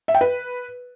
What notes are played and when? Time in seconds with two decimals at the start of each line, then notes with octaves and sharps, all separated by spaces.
0.08 E5
0.15 G5
0.21 B4